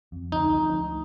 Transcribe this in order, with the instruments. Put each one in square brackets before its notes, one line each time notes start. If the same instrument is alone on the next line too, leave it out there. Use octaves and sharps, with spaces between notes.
[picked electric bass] F2
[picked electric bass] D2 [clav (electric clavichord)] D#4
[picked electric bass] F3
D2